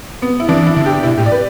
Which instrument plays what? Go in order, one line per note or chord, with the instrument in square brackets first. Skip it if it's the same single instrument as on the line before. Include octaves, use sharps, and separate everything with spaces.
[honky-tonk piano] B3
E4
[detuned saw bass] E3 [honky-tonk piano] D4
[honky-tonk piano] E4
[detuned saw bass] D3
[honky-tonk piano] G4
[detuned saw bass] B2 [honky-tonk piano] E4
[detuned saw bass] A2 [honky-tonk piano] G4
[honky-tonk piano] D5
B4